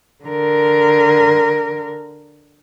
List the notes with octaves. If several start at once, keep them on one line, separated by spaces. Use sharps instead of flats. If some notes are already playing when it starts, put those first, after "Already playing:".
D3 A#4